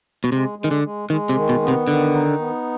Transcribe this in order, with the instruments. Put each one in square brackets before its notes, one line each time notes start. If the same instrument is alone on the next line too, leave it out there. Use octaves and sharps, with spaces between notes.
[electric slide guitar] B2
[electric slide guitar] C3 [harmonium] G#3
[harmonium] G#3
[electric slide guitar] D#3
D3
[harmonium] G#3
[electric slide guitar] D#3 [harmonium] G#3
[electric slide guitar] C3
[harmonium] D#3
[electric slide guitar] B2
[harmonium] B3
[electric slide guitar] C3
[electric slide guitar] D3 [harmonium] D#3
[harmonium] D#4
B3